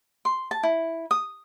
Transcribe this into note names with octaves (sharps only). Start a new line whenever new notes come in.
C6
A5
E4
D#6